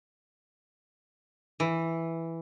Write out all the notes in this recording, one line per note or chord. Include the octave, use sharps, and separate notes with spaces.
E3